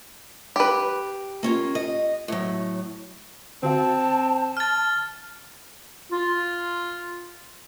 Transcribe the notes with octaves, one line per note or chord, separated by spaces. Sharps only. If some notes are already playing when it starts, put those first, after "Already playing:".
G4 B4
A#3 C#4 F4
D#5
A2 F#3
D3 C4 F#4 F5 A5
F6 A6
F4